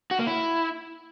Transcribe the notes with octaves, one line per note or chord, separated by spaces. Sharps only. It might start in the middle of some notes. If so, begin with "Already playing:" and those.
F#4
A#3
E4